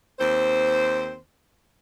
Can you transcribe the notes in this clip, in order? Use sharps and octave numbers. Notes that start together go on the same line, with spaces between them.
D#2 C4 C5